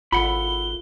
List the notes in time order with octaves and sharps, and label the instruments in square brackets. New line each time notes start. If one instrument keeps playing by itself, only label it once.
[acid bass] G#1 [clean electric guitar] E4 F#5 B5 [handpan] F4 A4 [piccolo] G7